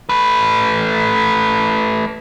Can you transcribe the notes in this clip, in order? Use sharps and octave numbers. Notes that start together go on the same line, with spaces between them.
A3 B4